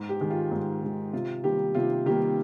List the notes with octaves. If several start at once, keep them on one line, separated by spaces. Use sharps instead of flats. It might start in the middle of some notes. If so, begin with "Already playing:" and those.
Already playing: G#2
G4
D#3 G#3
F4
G#2
D#3 G#3
C3 F4
D#3 G3 A#3 G4
C3 F4
D#3 G3 A#3 G4